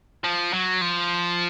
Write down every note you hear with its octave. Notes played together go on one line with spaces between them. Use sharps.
F3
F#3
F3